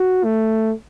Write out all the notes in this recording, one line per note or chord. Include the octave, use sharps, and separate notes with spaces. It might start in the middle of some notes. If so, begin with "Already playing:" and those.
Already playing: F#4
A3